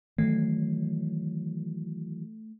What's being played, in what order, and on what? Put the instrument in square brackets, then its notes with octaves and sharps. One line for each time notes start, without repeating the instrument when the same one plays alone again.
[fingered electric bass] D#3 E3 F#3 [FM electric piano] A3